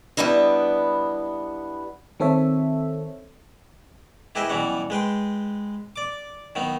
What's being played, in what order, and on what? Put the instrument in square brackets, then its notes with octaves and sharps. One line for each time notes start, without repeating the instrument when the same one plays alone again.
[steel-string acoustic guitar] G3 B3 D4 E4 D#5
[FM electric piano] D#3 C4 A4 C#5 E5
[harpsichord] E4 G4 G#4 B4 D#5 E5
B2 E3 F#3 G3 C#4 F#5
G#3 B4 G5 C6
D5 D6
D#3 F#3 B3 D#4